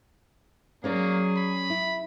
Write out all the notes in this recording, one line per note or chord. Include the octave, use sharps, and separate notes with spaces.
F#3 A#3 C#4 G#4 C#5 D5
B5
E4